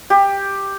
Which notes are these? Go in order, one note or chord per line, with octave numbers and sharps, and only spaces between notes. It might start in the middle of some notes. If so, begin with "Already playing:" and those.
G4